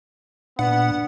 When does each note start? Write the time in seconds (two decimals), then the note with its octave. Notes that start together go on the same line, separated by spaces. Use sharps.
0.59 A#2 B3 D4 F#5